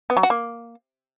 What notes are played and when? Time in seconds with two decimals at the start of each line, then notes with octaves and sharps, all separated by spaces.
0.10 B3
0.17 F#3
0.23 F#4
0.30 A#3